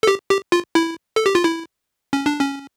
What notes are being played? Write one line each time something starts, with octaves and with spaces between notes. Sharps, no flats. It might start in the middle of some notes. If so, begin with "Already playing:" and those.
A4
G4
G4
F4
E4
A4
G4
F4
E4
C#4
D4
C#4